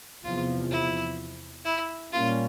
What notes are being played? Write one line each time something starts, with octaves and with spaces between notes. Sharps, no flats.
E2 C3 F3 F4
E4
E4
A#2 G3 A#3 C#4 F4